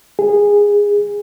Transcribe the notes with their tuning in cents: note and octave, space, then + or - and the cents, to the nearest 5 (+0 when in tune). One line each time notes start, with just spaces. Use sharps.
G#4 -15